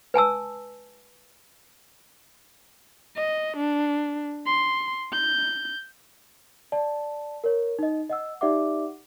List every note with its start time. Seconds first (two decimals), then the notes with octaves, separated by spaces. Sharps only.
0.14 B4 G#5 A5 E6
3.16 D#5
3.57 D4
4.46 C6
5.12 G6
6.72 D5 A5
7.44 A#4 C#5
7.79 D#4 D#5
8.09 D#5 F#5 E6
8.41 D#4 G4 D5 E5 F#5 D6